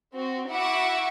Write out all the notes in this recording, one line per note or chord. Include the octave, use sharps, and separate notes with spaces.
C4 F#4
E4 F#4 E5 F#5 C#6 D6